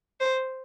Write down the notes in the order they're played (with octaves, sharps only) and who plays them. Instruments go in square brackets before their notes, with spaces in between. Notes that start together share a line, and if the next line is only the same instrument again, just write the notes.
[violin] C5